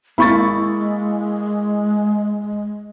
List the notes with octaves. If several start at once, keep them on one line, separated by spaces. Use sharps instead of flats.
G#3 A#3 E4 B5 C#6 A6